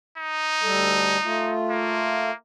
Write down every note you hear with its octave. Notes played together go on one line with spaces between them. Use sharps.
D#4
D2 G3 A4
A3 F4
A#3